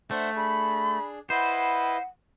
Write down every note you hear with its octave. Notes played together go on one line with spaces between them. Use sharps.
A3 D4 C5 E5 F#5
D4 G#4 B5
E4 B4 C5 D#5 F#5